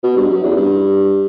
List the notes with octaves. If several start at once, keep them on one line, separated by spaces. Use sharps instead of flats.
B2
G2
F#2
E2
G2